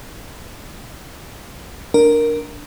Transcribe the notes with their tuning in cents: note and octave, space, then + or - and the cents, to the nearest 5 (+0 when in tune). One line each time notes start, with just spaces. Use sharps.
D4 +0 A#4 +0